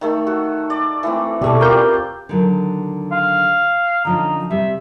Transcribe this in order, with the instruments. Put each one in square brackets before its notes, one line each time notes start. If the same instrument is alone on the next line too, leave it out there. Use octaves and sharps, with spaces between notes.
[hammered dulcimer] D#3 A3 A4
F#4 A4
D5
E3 A3 C4
[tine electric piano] B2 A4 [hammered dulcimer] G3 C#6 D6
[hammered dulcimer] C4 F4 G4 [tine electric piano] A#4 G6
[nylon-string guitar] D3 D#3 F#3
[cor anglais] F5
[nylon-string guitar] D3 F3 C#4 [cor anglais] D#4
[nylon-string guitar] C3 G3 [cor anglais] E5